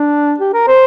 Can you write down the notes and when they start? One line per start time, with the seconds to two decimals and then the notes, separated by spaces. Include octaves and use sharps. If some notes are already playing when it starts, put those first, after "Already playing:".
Already playing: D4
0.40 G4
0.54 A#4
0.68 C5